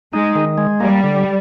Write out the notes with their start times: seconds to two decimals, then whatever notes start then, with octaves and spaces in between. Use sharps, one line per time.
0.13 G#3 D#4
0.35 D#3
0.58 G#3
0.80 G3 A#3
1.04 D3